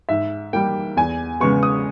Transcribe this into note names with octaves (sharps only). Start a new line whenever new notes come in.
G#2 E5
G3 A#3 G5
E2 G#5
C#3 G#3 B3 C#6
D#6